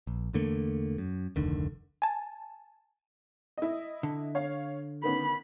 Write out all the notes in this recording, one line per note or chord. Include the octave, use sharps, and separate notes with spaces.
A#1
E2 D3 A3 A#3
F#2
F1 D2 D3 D#3
G#5 A5
E4 D#5
D3
C#5 F5
D#3 B3 C#4 B5